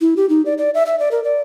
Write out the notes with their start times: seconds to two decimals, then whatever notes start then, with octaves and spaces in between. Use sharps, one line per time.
0.01 E4
0.17 G4
0.29 D#4
0.46 D5
0.58 D5
0.74 E5
0.86 E5
0.99 D5
1.11 A#4
1.24 D5